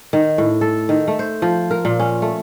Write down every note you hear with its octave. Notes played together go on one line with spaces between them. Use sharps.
D#3
A2
A4
D#3
A3
C5
F3
A#4
A#2
C#4
A3